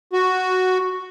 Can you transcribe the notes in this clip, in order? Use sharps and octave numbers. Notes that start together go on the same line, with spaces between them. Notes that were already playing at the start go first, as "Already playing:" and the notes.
F#4